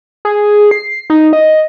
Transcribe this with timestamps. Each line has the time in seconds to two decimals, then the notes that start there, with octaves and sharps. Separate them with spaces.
0.25 G#4
0.71 C7
1.10 D#4
1.33 D#5